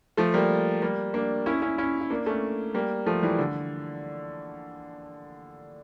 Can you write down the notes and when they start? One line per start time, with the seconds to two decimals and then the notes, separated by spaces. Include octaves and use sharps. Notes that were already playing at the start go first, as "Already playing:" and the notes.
0.17 F3 A3
0.34 G3 A#3
0.82 G3 A#3
1.14 A#3 D4
1.46 C#4 E4
1.62 C#4 E4
1.78 C#4 E4
2.01 E4
2.10 A#3 D4
2.26 A3 C#4
2.74 G3 A#3
3.06 F3 A3
3.23 E3 G3
3.38 D3